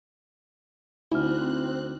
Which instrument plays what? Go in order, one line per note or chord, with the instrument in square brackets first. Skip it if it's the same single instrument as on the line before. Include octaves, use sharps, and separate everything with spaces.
[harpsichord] D2 [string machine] C4 F#6 [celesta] D#4 F6 [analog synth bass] E4